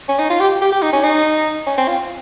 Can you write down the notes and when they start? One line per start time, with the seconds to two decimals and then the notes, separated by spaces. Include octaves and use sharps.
0.09 C#4
0.19 D#4
0.30 F4
0.40 G4
0.61 G4
0.72 G4
0.82 D#4
0.93 C#4
1.04 D#4
1.67 C#4
1.78 C4
1.88 F4